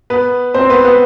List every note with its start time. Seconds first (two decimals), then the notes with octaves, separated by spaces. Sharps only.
0.10 B3 B4
0.54 C4 C5
0.70 B3 B4
0.85 B3 B4